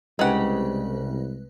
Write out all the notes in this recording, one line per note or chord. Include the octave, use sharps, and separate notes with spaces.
C2 C#3 G#3 D#4 G4 B4 F#5